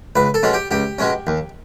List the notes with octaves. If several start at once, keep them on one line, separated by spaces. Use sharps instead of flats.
C#2 B4
A4
B2 G#3 C#4
G4
C#2 G4
B2 G#3 C#4
D#2